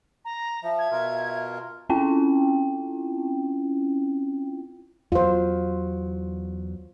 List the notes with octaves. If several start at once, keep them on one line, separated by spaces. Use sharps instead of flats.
A#5
F3 E5
G#6
B2 F4 A#4
C4 C#4 E4 F4 G5
E2 F#3 F4 C5